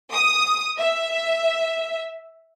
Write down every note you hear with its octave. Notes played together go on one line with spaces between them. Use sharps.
D#6
E5